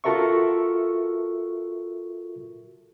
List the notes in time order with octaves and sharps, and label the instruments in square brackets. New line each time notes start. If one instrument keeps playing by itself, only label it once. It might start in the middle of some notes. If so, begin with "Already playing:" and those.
[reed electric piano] F4 F#4 A4 A#4 E5 C#6